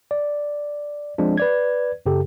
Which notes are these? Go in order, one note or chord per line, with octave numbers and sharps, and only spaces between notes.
D5
F3 G#3 C4 D4
B4 D5 G#6
F#2 C#3 G4 A4